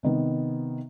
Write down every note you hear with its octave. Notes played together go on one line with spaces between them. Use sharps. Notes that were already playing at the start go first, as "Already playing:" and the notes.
C3 D#3 B3